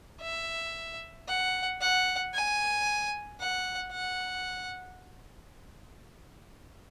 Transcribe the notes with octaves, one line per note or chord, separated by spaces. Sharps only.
E5
F#5
F#5
G#5
F#5
F#5